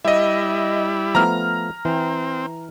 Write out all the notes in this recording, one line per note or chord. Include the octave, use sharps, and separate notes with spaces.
G3 E4 D#5 E5
F3 A3 B3 A#5 F6
E3 C4 G5